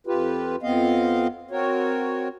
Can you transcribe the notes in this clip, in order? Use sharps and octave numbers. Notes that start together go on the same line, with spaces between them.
F2 F4 G4 B4
F2 B3 C4 D#5 F5
C4 F#4 A#4 C#5